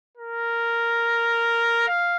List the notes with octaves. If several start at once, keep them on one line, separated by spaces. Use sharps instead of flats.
A#4
F5